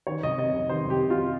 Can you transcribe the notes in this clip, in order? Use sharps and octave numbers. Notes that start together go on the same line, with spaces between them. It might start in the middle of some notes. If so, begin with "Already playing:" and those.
D#3 C#5
C2 D#5
C3 D#5
C2
D#3 C5
C2 G4
C3
F4